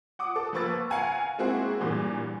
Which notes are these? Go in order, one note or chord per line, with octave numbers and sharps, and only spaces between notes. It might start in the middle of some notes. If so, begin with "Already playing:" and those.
F#5 D6 D#6
A4
F3 A#3 B4 C#6 E6 A6
F5 F#5 G#5 A#5
G#3 A#3 C4 E4 F#4 G#4
G2 A#2 E3